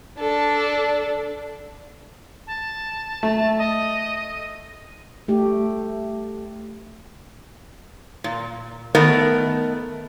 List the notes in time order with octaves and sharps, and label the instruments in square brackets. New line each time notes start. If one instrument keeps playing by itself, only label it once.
[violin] D4 A4
[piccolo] A5
[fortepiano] A3
[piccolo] D#5
[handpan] A3 G4
[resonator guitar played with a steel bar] A#2
D#3 A3 B3 A#4